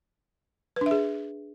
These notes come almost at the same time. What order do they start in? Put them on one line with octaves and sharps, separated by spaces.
B4 D4 E5 G#4